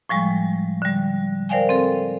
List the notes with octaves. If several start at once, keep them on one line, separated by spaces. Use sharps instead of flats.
A2 F3 G3 G#3
D3 G3
A#4 C5 D5 F5 G5 G#5
C4 A4